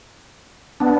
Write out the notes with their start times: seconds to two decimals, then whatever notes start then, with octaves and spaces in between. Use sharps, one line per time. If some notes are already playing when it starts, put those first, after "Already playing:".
0.80 B3 D4